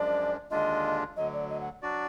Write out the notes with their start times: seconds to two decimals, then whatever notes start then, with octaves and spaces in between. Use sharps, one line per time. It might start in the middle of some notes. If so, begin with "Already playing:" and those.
Already playing: F#2 F3 G#3 D4 D5
0.51 D#2 D3 G#3 D4 F4 D#5
1.17 D2 D3 F#3 D#5
1.33 D5
1.49 D#5
1.61 F#5
1.82 F#3 D4 F#4 D5